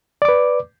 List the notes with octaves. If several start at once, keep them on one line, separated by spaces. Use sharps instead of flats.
B4 D5 D6